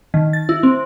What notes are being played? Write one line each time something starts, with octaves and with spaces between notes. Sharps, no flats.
D#3
A6
E4
C4